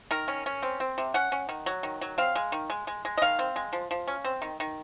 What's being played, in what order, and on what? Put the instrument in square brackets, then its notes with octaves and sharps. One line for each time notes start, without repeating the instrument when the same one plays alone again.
[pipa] D#3 A#4
C#4
C#4
C4
C4
C3
C#4 F#5
C#4
D#3
F#3
D#3
F#3
C4 F5
G#3
D#3
G#3
G#3
G#3
D#5
D#3 F5
C4
G#3
F3
F3
C#4
C4
D#3
D#3